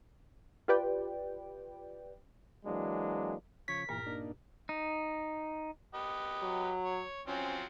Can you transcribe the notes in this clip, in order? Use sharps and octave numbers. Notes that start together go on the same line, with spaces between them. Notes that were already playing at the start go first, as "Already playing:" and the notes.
F4 G4 B4 D5 G5
E3 F#3 G#3 A#3 D4
C#3 F3 C#5 B6
G2 A#2 E3 A#3 A#4
A#3 D4 D#4
D#4
G4 B4 D#5
F#3
C#5
F3 F#3 C4 C#4